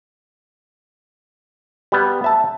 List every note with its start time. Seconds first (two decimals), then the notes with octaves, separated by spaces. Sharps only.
1.92 G3 B3
2.24 E5 A5